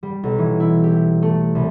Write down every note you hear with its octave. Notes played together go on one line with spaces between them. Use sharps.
G3
B1
E3
E4
G4
A3
C2